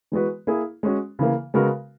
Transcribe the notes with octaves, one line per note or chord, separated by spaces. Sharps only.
E3 G#3 B3 F#4 B4
A#3 E4 G#4
G#3 C#4 F#4
C#3 E3 A#3
C#3 G#3 B3 F#4 A#4